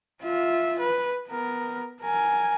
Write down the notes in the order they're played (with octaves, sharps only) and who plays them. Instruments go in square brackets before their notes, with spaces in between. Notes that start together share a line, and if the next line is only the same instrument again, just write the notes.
[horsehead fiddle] F4 E5
B4
B3 A#4
A#4 G#5